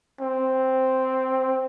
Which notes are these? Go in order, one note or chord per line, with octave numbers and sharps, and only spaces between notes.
C4